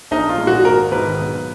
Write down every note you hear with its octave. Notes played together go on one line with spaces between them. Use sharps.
A#1 D#4
F4
A#2 G#3
F#4
G#1 A#4
G#2 D#3 B4
B1